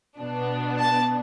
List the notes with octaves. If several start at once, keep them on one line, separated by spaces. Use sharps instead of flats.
B2 B3 D4
A5